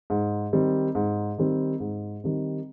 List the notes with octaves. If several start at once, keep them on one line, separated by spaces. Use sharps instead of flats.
G#2
D#3 G3 C4
G#2
D#3 G3 C4
G#2
D#3 G3 C4